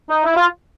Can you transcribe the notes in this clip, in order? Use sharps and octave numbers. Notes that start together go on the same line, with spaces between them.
D#4
E4
F4